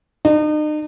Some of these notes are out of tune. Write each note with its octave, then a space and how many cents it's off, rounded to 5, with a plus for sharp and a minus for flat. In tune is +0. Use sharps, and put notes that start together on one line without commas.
D#4 -40